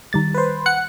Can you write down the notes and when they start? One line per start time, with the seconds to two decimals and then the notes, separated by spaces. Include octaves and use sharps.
0.13 D#3 G3 A6
0.34 B4 C5
0.66 F#5 C#7